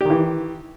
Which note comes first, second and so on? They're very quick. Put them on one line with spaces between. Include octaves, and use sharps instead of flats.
G4 D#3 E3